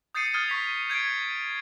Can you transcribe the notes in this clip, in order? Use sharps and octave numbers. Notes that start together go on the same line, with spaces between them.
D#6 G6 A6 C7 C#7 D#7
D#6 F6 G#6 A6 D#7
C#6 B6 F7
G6 G#6 C7 D7